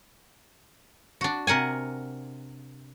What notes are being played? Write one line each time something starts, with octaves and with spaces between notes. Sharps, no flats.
D4 F#4
C3 A#4 F#5 G#5